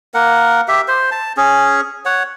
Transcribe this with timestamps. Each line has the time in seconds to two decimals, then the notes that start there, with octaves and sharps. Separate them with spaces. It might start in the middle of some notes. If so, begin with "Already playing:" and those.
0.14 A#3 A#4 F#5
0.68 G4 E5
0.88 C5
1.11 A5
1.37 C#4 G#4
2.05 C#5 F#5